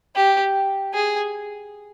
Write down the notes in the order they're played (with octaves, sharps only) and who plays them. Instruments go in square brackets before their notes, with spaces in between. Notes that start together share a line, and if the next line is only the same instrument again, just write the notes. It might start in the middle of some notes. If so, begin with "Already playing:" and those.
[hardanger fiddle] G4
G#4